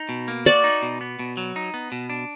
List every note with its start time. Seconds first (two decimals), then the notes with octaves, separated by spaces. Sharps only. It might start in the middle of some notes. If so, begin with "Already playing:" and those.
Already playing: D#4
0.09 B2
0.28 A#3
0.46 F#4 D5
0.64 D#4
0.82 B2
1.01 B3
1.19 B2
1.37 F#3
1.56 D#4
1.74 B3
1.92 B2
2.10 D4